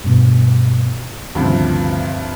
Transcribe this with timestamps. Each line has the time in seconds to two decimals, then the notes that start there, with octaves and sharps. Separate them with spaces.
0.04 G2 B2
1.35 D2 G2 C3 D#3 F3 C#4